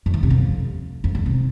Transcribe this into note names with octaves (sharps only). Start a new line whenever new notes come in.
F2
E3
C3
F2
F2
D3
C3